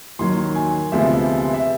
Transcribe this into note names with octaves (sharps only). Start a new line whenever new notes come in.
D#2 D#3 F#3 C6
G#5
D2 C3 F3 G#3 B3 E5
E5